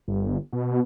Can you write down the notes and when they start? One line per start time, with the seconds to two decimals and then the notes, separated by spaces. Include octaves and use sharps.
0.08 G1
0.53 B2